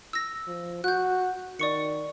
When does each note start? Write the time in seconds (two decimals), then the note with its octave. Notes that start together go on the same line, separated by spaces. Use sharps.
0.13 E6 A#6
0.47 F3
0.84 F#4 F#6 G6
1.59 D#3 D5 C#6 C#7